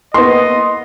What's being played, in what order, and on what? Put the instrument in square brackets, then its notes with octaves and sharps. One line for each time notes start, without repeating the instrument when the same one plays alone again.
[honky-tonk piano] A#3 B3 [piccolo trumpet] D#5 [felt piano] C6